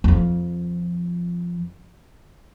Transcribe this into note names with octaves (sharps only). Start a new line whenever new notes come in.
F2 F3